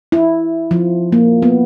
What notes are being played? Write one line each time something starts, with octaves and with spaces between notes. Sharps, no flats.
E4
F3
A#3
B3